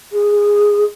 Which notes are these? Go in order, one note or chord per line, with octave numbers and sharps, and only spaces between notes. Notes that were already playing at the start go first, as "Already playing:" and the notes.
G#4